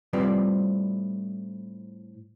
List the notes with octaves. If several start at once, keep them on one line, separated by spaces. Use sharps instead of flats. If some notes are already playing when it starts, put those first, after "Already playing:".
A2 G3 C4 F4 B4 D5